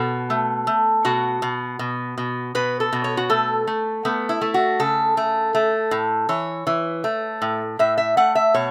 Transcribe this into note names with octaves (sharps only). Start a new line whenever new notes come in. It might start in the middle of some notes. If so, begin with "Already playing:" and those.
Already playing: B2 A4
A3
A3
B2 F#4
B2
B2
B2
B2 B4
A4
B2
C#5
F#4
A3 A4
A3
A3 B3
E4
A3
F#4
C#3 A4
A3
A3
A2
E3 C#5
E3
A3
A2
A2 E5
E5
A3 F#5
E5
B2 C#5